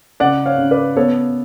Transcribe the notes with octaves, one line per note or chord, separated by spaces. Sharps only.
C#3 D5 F#5
C#5 F5
C#3
B4 D5
B3 A4 C#5